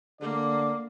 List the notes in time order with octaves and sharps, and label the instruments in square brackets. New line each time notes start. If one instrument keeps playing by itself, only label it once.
[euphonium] D3 [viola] A#3 [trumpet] D5